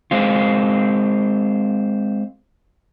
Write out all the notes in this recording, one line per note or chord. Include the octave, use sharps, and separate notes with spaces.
G#3 C4 F4